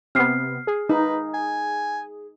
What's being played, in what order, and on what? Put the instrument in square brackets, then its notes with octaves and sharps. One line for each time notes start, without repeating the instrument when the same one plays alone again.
[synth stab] C3 B3 [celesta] F6 C7
[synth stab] G#4
[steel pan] D#4 [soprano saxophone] B4
[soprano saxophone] G#5